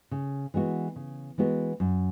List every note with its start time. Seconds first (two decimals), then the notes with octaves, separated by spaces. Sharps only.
0.11 C#3
0.54 E3 G#3 B3 F#4
0.96 C#3
1.38 E3 G#3 B3 F#4
1.80 F#2